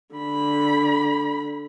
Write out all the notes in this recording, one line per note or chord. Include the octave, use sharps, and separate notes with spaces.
D3 B5